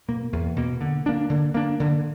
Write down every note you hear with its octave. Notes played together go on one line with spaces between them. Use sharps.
B2 A#3
E2
B2 A#3
D3
A#3 D4
D3
A#3 D4
D3